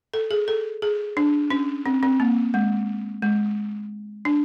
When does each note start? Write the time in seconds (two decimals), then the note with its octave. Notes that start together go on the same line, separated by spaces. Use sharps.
0.14 A4
0.31 G#4
0.48 A4
0.82 G#4
1.17 D4
1.50 C#4
1.86 C4
2.03 C4
2.20 A#3
2.54 G#3
3.22 G#3
4.25 D4